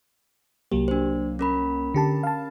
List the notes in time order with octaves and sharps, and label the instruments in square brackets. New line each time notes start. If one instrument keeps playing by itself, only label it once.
[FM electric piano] C2 F#3 A#3 [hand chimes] G4
[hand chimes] D4 C5
C#4 A#4 B5
[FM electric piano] D3 G4 A5
F5 A5